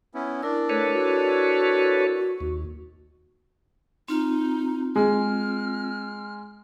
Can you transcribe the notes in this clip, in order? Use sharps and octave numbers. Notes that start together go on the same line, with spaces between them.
B3 C#4 E4
D4 E4 A#4 E6
A3 A4 B4 C#5
F#4
D#2
C4 D#4 F4
G#3 F6